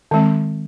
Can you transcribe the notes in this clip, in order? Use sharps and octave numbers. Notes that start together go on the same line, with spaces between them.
D#3 G#3 C4